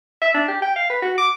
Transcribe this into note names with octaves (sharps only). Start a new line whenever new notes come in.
E5
D4
G4
G5
F5
B4
F#4
D6